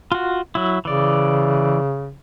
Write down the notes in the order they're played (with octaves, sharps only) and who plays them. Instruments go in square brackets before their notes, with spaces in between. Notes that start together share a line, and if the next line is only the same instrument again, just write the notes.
[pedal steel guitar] F4 F#4
F#3 E4
[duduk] C#3 [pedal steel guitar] E3 D5